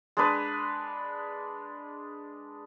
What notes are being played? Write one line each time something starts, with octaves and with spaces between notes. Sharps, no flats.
G#3 D4 B4